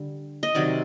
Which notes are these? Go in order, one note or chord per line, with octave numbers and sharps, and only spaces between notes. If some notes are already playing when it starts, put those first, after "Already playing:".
Already playing: D3 G3
D#5
C3 D#3 F#3 D5